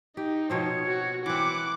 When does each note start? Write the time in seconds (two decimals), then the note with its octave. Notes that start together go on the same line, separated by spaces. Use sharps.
0.17 D#4 G4
0.50 B2 F3 C4 C#5
0.86 F#4
1.26 E3 C4 F#5 D6